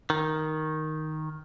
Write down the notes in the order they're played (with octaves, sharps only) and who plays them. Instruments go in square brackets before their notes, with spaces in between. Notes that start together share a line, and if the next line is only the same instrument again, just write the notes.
[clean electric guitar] D#3